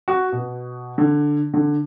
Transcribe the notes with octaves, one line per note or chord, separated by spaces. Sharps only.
F#4
B2
D3
D3